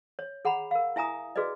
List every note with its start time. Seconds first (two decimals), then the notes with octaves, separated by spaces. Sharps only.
0.19 C#5
0.45 G#4 F#5 A#5 B5
0.71 A#4 F5
0.96 E4 E5 G#5 A#5 D#6
1.36 F#4 G#4 B4 D5 D#5